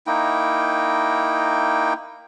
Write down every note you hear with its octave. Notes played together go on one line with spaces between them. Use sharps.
A#3 D#4 E4 G5